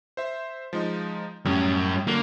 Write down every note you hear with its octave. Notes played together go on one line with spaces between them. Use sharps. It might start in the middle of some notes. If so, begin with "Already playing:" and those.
C5 E5
F3 G#3 D#4
F#2 A2 G3 C#4
D3 F#3 A#3